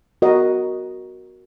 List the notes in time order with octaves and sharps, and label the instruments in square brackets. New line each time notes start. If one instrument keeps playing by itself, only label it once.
[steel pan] F#4 A#4 D#5